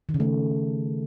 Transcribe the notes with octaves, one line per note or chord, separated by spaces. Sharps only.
D#3
C#3
A3